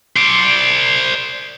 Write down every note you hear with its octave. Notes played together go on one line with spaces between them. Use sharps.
C5 D5